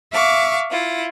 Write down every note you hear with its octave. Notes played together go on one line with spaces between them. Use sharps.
E5 F5 C#6 D6
E4 F4